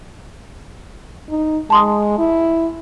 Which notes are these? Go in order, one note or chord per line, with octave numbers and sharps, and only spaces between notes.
D#4
G#3 A5 C6 D#6
E4